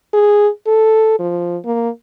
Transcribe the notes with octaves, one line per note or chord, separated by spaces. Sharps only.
G#4
A4
F3
A#3